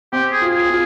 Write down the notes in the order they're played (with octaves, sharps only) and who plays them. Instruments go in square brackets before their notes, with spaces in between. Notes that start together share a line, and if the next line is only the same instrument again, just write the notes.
[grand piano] C4 [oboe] G4
[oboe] G#4
[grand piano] F4
[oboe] G#4
[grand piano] F4